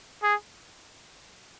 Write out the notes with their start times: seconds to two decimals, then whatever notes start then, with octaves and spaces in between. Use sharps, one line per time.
0.23 G#4